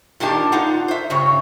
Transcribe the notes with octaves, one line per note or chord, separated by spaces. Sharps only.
A#2 D#3 A#3 D4 G4 A5
D#4 F4 F#5
C5 E5
G2 C#3 C#5